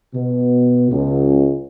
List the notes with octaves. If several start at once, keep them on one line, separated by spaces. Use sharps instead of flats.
B2
C#2